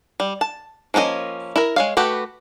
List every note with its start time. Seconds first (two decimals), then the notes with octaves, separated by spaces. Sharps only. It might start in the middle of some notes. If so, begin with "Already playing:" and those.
0.20 G3
0.41 A5
0.94 F3 A#3 C#4 F#4 D#5
1.56 E4 A#4
1.76 G#3 C#5 F5
1.97 A3 F#4 G4 B4